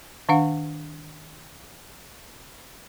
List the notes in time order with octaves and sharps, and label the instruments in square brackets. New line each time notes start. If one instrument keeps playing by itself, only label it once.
[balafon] D#3 D4 F5 F#5